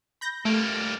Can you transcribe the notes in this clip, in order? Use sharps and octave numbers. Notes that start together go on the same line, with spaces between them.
B5 G6 A#6
G3 A3 A#3